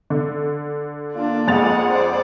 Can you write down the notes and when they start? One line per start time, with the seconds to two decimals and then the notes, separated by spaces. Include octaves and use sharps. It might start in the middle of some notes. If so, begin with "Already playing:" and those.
0.10 D3
1.15 A#3 D4 F4 D5
1.48 F2 G#3 F#5 A6 F7
1.88 C5 D5